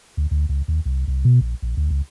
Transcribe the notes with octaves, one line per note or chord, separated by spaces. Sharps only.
D2
D2
C#2
D#2
C2
C2
B2
A#1
A#1
D2
C#2